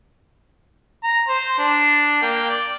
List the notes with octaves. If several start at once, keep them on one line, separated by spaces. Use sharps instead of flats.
A#5
C5
D4
A#3 G5
D5